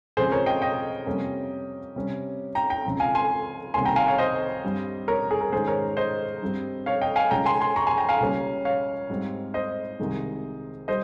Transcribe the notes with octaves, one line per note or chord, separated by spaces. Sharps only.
C#2 C#3 F3 C4 G#4 C5
A#4 C#5
D#5 G5
D#5 G5
F2 C3 G3 A#3 C#4
C3 G3 C#4
G5 A#5
G5 A#5
C#2 C#3 F3 C4
F5 G#5
G#5 C6
C2 C3 D#3 A#3 C#4 G#5 C6
G5 A#5
F5 G#5
C#5 F5
C5 D#5
G2 G3 C4
A#4 C#5
G#4
A#4
G#2 D#3 G#3 C#4 G#4 C5
A#4 C#5
C5 D#5
G2 G3 C4
C#5 F5
D#5 G5
F5 G#5
C#2 C#3 G#3 C#4 G5 A#5
G#5 C6
G#5 C6
A#5 C#6
G#5 C6
G5 A#5
F5 G#5
C#2 C#3 G3 A#3 C#4
C#5 F5
G#2 G3 C4
C5 D#5
C2 C3 D#3 G#3
G3 C5 D#5